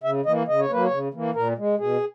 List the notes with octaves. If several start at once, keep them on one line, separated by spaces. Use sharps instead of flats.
C#3 E5
E3 A#3 D#5
C#3 D#5
C#5
F#3 A#3 B4
C#5
C#3
E3 A#3
A#2 A#4
G#3
B2 G#4